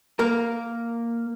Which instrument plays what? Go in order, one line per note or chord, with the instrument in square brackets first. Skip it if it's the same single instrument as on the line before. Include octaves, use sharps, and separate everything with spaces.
[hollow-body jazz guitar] A#3 A#4